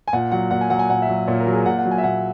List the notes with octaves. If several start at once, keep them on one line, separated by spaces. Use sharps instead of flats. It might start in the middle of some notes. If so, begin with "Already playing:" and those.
G#5
A#2 F#5
F#3 F#5
A#2 F#5
G#5
F#3 F#5
G#5
A#2 F#5
E5
F#3
A#2 C#5
A#4
F#3
G#4
A#2 F#5
F#5
F#3
G#5
E5
A#2 F#5